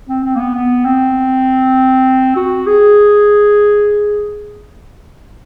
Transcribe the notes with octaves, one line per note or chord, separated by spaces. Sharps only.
C4
C4
A#3
B3
B3
C4
F#4
G#4